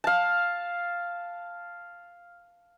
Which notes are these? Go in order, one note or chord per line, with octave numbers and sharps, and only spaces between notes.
F5 A5